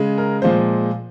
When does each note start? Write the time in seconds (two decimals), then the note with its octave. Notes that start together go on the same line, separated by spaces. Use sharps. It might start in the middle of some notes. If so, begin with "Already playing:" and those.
Already playing: C#3 G#3
0.18 A#4
0.42 A#2 F3 G#3 C5